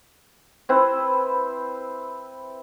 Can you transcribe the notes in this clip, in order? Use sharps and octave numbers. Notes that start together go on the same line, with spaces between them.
C4 E4 B4 C5